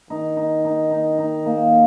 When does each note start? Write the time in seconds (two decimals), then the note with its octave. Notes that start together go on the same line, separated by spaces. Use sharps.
0.10 D#3 D#4
0.37 D#4
0.65 D#4
0.91 D#4
1.18 D#4
1.46 A#3